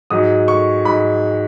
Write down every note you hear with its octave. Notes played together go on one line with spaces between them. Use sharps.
G#2 F#3 D#6
C#6
G#2 F#3 B5